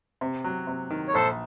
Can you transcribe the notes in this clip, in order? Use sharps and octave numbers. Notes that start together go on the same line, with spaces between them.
C3
F#3
C3
D#3
C#5
A#1 A4 C5